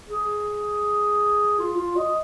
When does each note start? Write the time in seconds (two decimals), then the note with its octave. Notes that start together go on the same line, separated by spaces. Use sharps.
0.08 G#4
1.59 F4
1.77 F4
1.97 D#5